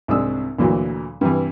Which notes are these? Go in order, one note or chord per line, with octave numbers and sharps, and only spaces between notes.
C2 G#2 C4 D4 D#6 E6
D2 A#2 E3 F#3
G2 C3 E3